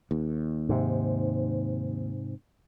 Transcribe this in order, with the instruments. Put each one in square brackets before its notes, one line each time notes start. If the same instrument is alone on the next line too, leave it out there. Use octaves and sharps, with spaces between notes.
[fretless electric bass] D#2
[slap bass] G#2 C3